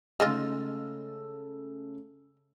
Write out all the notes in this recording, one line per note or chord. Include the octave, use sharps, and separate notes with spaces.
C#3 G#3 A3 D#4 F4 E6